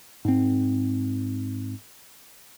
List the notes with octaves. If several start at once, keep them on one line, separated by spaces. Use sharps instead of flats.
G#2 C4